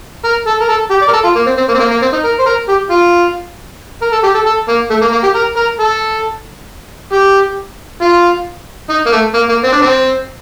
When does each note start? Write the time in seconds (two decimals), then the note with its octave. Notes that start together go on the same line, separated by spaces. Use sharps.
0.24 A#4
0.47 A4
0.61 A#4
0.69 A4
0.91 G4
1.02 D5
1.08 A#4
1.13 A4
1.24 F4
1.35 A#3
1.46 C4
1.58 C4
1.69 A#3
1.75 C4
1.80 A#3
1.91 A#3
2.02 C4
2.13 D#4
2.24 A#4
2.39 C5
2.46 A#4
2.69 G4
2.90 F4
4.02 A#4
4.12 A4
4.23 G4
4.34 A4
4.46 A4
4.68 A#3
4.90 A3
5.01 A#3
5.12 A#3
5.23 G4
5.35 A#4
5.57 A#4
5.79 A4
7.13 G4
8.01 F4
8.90 D#4
9.06 A#3
9.12 A3
9.34 A#3
9.49 A#3
9.64 C4
9.73 D4
9.82 C4